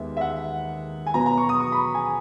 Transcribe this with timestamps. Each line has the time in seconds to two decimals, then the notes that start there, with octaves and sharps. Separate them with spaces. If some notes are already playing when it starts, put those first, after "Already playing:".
Already playing: D#2 D#3 G#3 B3 E5
0.17 E5
0.21 F#5
1.07 G#5
1.14 B2 F#3 B3 A#5
1.26 A#5
1.38 C#6
1.49 D#6
1.60 C#6
1.72 B5
1.95 G#5